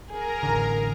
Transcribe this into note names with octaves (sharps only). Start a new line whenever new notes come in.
G#4 A#4 A#5
A1 D3